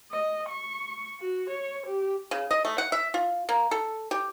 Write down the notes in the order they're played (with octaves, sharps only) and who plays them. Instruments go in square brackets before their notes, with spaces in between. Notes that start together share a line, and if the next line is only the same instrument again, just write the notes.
[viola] D#5
C#6
F#4
C#5
G4
[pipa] C#3
D#5
A3
F#5
E5
F4
A#3
A4
G4